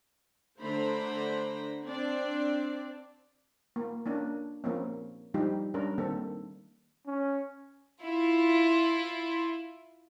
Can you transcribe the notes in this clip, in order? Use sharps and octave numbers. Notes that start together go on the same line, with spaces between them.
D3 A3 D4 C5 A#5 B5
C4 D4 D5
A#3
A#3 C#4 D4
F3 A#3 C4 C#4
F3 G3 D#4 G4
G3 C#4 D4 A#4
D#3 A#3 C4 A4
C#4
E4 F4